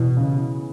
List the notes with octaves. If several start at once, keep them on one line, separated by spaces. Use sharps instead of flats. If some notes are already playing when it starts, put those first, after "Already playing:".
Already playing: B2 E3
C#3